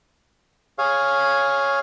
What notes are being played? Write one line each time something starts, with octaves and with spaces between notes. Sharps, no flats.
G#4 C#5 F5